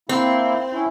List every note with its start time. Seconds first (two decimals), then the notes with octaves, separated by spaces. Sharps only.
0.09 A#3 C4 E4
0.73 C#4 E4